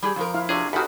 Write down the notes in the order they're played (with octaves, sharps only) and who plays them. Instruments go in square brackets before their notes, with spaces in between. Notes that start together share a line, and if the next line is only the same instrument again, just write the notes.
[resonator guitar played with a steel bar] G3 G4 G#4
F2 F3 A#4
[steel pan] E4 F4 F5
[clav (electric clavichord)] C3 G#4 [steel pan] D4 F4 C#5
[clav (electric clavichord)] E2 D#3 [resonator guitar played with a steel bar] F#4 G4 [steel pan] A4 B5